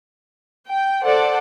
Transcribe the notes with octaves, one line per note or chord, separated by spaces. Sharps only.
G5
A4 C5 D5 F#5